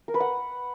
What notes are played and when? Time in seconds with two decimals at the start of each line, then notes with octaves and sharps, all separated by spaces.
0.08 A#4
0.14 B4
0.20 F#5